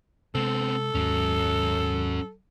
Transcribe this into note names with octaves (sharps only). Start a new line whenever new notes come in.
C3 G#3 B3 C4 A4
D#2 G#2 F#3 C#4